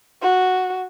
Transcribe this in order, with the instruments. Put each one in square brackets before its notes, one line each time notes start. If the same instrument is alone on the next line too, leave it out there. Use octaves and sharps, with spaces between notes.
[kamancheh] F#4